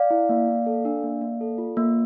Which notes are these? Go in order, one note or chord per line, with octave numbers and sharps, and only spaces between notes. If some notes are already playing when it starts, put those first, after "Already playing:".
Already playing: D5 F5
E4
A#3
A#3
A4
D4
A#3
A#3
A4
F4
A#3